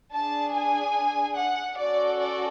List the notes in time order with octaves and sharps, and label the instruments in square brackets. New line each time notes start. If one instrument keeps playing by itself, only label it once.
[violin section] D4 G#4 A5
G#5
F#5
C#4 F#4 A4 D5
D5